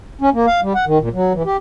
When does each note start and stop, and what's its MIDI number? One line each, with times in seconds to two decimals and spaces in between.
0.21 0.29 61
0.34 0.46 58
0.47 0.61 77
0.62 0.73 55
0.75 0.85 78
0.87 0.98 51
1.00 1.09 46
1.13 1.33 54
1.34 1.43 52
1.45 1.57 67